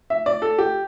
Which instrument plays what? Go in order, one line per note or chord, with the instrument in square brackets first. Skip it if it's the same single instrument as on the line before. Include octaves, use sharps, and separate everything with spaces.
[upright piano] E5
D5
A4
G4